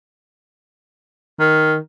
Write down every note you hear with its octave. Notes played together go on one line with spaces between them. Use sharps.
D#3